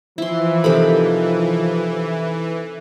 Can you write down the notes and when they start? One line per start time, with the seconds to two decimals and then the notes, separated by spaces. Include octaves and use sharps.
0.18 E3 F3 E4 C6
0.64 C3 D#3 A4 B5